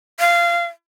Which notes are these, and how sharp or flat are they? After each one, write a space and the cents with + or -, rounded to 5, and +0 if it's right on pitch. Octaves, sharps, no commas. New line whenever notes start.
F5 -20